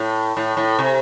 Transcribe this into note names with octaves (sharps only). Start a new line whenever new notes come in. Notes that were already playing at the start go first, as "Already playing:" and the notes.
Already playing: A2
A2
A2
C3